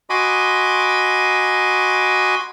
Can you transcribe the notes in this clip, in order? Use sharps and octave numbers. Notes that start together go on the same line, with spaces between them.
F#4 D#5 G#5 B5 C6 D6